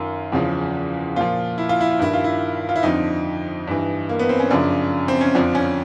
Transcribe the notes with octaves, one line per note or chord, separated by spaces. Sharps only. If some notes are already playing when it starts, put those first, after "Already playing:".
Already playing: F#2 D#3 F4
E2 C#3 F3
A#2 F3 F4
E4
F4
E4
F4
G2 D#3 E4
F4
E4
F4
E4
F2 D3 F3 D#4
G2 E3
A#3
B3
C4
C#4
F#2 C#3 F3 D4
C4
C#4
F2 D3 F3 D4
C#4